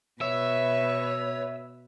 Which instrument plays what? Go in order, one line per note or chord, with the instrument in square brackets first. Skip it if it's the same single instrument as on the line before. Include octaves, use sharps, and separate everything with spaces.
[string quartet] B2 B4 [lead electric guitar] C#5 [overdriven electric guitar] E5